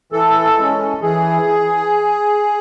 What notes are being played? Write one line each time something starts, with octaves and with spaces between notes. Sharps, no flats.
E3 A4
G#3 C#4
E3 G#4